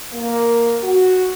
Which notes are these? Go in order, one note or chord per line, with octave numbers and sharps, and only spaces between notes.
A#3
F#4